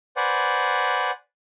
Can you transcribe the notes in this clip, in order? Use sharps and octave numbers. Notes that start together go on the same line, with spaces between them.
B4 C5 D5 F#5 G#5